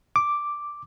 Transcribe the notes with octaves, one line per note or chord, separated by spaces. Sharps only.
D6